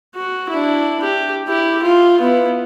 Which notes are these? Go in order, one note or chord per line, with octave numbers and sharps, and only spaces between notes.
F#4
D4 E4
G4
E4 G4
F4
B3 E4